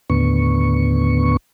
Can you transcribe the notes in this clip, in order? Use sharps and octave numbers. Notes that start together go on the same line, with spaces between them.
D#2 A2 D3 B3 C#6